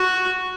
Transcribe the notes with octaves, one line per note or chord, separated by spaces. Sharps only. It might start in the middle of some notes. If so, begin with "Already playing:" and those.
Already playing: F#4